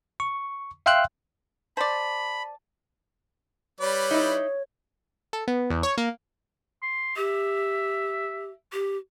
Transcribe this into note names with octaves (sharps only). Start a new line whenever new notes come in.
C#6
E5 F5 G5 C6 E6 F#6
C5 D5 A5 B5
G3 B4 C#5 D5
D#4 E4
A4
B3
E2
C#5
A#3
C6
G4 E5
G4